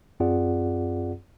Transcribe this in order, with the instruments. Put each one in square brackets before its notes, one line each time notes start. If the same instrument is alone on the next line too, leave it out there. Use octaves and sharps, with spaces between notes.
[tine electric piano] F#2 C4 F4 G#4 D5 F#5